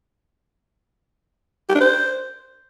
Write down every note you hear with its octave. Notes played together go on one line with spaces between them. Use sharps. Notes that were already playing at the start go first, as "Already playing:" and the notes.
G4
D4
C5